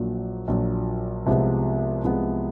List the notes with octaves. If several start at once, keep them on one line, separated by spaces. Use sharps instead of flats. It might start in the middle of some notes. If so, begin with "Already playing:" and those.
Already playing: A#1 A#2 F#3
A#1 A#2 F#3
C2 C3 F3 G#3 B3
C2 C3 F3 G#3 B3